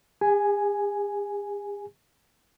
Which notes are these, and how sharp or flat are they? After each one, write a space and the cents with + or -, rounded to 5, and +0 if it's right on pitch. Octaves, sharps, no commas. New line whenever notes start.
G#4 -45 G#5 +0